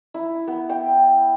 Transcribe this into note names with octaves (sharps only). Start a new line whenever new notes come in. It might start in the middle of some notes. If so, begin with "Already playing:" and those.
E4
B3
G5